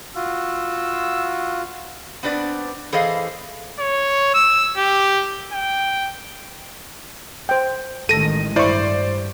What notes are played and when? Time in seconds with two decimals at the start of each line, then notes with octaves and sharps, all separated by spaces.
0.16 F4 F#4 E6
2.23 B3 C4 D4 B4 D5
2.92 E3 G#4 A4 C5 D#5 F5
3.79 C#5
4.34 E6
4.77 G4
5.53 G5
7.49 C5 G5
8.09 A1 D#3 G#3 A4 A#6 D#7
8.56 G2 E4 C5 D5 C#6